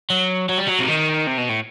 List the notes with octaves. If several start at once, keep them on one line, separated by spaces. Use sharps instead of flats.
F#3
F#3
G3
F#3
C3
D#3
C3
B2
A2